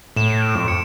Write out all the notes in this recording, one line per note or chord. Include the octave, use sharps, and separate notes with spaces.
A2 E7
D7
F2
C#7